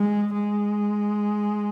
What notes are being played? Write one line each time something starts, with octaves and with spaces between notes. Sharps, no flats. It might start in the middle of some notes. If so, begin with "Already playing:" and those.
Already playing: G#3
G#3